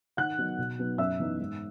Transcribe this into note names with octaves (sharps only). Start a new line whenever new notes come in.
D#3 F#5 F#6
F#3 B3 D#4
B2
F#3 B3 D#4
F#2 E5 E6
E3 B3 D#4
G#2